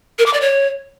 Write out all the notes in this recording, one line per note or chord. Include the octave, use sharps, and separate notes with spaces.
A#4
D6
D5
C#5